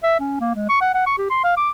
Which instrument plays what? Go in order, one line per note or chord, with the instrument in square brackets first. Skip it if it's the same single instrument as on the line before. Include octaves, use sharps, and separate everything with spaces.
[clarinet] E5
C#4
A#3
G#3
C#6
F#5
F#5
C#6
G4
C6
F5
D6